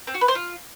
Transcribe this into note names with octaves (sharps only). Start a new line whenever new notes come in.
C4
F#4
B4
C5
F4